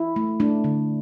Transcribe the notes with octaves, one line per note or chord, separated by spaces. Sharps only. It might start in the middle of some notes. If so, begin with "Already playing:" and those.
Already playing: E4
A3
A3 D4
D3